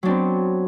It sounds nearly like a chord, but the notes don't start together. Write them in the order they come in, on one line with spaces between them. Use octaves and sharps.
F#3 D4 C4 B3